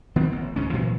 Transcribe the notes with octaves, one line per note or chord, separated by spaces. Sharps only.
D#3 B3 C4
A1
C#2 G#2 C#4
A#2 E3 F#3